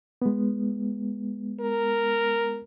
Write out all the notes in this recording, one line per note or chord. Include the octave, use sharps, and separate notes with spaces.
G#3 B3
A#4